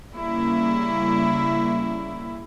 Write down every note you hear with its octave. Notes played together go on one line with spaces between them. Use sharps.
C#3 G3 A#3 E4